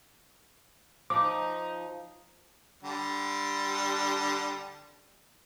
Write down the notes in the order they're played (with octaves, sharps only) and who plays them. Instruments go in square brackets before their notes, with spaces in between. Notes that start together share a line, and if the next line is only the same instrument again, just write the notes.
[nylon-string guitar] F3 [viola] D#4 [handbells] D6
[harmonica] D3 G3